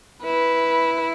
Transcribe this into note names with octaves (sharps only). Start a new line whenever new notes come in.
E4 B4